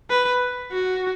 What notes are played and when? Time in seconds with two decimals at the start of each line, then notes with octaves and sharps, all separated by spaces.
0.10 B4
0.72 F#4